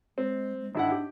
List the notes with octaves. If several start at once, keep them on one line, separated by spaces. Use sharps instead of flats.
G#3 C4
G#3
G#1 D4 E4 F#5
G4